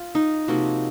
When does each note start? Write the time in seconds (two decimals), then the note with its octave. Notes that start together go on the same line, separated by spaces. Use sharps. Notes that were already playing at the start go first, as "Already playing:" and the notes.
Already playing: F4
0.15 D#4
0.48 C3 F3 A#3 D#4 F#4